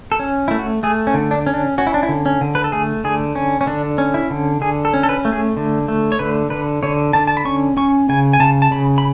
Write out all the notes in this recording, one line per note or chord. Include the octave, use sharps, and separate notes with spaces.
A4
C#4
A3 E4
F#4
A3 G#4
C#4
D3
D4
C#4
D4
C#4 F#4
E4
D4
E4
D3
C#4
D3
B4
A4
A3 G#4
D3 G#4
C#4
C#4
D3 D4
C#4
E4
D3
D3 G#4
A4
C#4
A4
B4
A3
G#4
D3
A3
C#5
D3 B4
D3 B4
D3 C#5
D3 A5
A5
B5
C#4 C#6
C#4 C#6
C#3 G#5
G#5
C#3 A5
A5
C#3 B5
B5